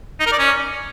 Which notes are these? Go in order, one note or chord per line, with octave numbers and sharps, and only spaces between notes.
D#4
A#4
D5
C#4